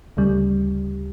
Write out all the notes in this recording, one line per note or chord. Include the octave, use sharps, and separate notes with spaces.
D2 C#3 G3